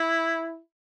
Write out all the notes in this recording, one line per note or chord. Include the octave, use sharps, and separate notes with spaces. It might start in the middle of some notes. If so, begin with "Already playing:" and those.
Already playing: E4